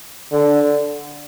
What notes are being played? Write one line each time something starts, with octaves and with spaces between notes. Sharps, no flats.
D3